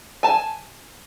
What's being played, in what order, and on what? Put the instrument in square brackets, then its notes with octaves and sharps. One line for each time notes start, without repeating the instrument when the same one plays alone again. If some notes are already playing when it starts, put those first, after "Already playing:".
[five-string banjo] G#5 A5